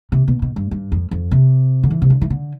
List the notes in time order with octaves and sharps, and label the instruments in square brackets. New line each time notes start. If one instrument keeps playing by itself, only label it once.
[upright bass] C3
B2
B2
G2
G2
F2
F2
C3
D3
E3
C3
D3
E3
D3